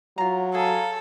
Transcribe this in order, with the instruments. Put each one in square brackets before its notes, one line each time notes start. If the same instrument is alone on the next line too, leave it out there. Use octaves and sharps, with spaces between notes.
[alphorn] F#3 [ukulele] F4 A#5
[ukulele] G#4 [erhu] A4 [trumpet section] F5 G#5 A#5